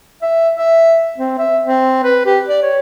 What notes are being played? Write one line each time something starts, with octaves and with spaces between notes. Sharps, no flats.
E5
E5
C4
E5
C4
B4
G4
D5
C#5